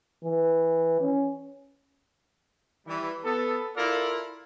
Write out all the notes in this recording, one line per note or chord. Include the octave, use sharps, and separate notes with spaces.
E3
C#4
E3 G3
B3 A4
E4 F4 A4 A#4 D5 F5